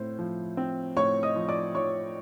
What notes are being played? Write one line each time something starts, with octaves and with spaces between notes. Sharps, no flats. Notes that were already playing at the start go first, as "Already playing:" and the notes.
Already playing: A2 C4 C5
F3
C4
A2 C#5 C#6
D#5 D#6
F3
D5 D6
F3 C#5 C#6